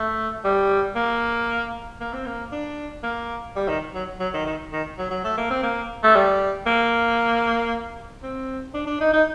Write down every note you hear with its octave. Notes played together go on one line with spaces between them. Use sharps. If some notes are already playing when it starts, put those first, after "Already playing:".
Already playing: A3
G3
A#3
A#3
C4
A#3
D4
A#3
G3
D#3
F#3
F#3
D#3
D#3
D#3
F#3
F#3
A3
A#3
C4
A#3
A3
G3
A#3
C4
D4
D4
D#4
D#4